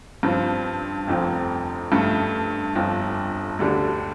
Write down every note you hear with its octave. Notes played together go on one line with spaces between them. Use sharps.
G2 F3 C4
F1 F2 F3 C4
G2 F3 A3
G1 F2 F3
D2 D3 G3 D4